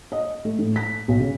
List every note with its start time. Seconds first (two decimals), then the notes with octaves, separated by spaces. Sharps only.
0.12 D#5
0.45 A3
0.59 A2
0.76 B6
1.08 B1
1.20 C#3